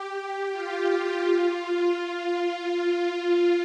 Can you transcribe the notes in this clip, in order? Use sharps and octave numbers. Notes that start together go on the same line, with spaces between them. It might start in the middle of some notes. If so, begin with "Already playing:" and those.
Already playing: G4
F4
G4
F4
F4